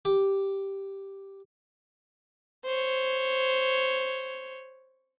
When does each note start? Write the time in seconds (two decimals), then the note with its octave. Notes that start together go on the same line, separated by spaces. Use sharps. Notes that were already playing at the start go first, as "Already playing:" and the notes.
0.05 G4
2.66 C5 C#5